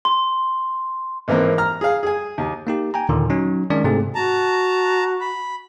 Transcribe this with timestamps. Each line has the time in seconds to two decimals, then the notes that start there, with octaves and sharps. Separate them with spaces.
0.05 C6
1.28 G#1 E3 A#3 C4
1.58 A#5 F6
1.81 G#4 F5
2.03 G#4 G#5
2.38 D#2
2.67 A#3 D#4 G4
2.94 G5 G#5 A#5
3.09 D#2 A#2 D3 D#3
3.30 F#3 C#4 D#4
3.70 D#3 G#3 C#4 D4 D5
3.84 G#2 C3 A3 C4 G#4 A4
4.15 F#4 A5 A#5
5.21 B5